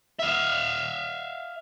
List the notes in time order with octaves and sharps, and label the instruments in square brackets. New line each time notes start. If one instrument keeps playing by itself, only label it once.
[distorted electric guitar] E5 F5